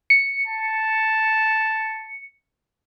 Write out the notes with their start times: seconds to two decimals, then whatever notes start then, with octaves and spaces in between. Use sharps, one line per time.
0.10 C#7
0.47 A5